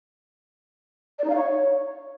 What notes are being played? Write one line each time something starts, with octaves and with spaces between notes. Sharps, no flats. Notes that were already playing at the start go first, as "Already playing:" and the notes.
D5
D#4
F5
C#5